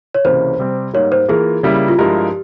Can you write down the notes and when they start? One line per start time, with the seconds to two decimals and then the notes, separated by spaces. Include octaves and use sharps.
0.14 C#5
0.25 C#2 C3 E3 A#3 C#4 C5
0.59 C3 G3 C4
0.94 G#2 G3 A#3 C#5
1.12 C5
1.29 E3 A#3 F4 G#4 A#4
1.63 C#3 G3 A#3 E4
1.88 F4
1.98 G2 F3 G#3 E4 G4 A#4